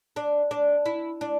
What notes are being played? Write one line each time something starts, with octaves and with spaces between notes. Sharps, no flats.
D4
D4
E4
D4